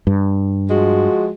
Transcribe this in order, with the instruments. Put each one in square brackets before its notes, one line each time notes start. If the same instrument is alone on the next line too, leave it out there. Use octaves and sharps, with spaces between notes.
[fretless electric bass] G2
[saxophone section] F3 G#3 F#4